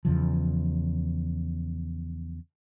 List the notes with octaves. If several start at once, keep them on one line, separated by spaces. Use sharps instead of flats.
E2 C#3 F3